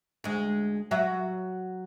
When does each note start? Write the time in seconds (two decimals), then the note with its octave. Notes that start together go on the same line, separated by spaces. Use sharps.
0.24 D2 G#3
0.91 F#3 F#4 E5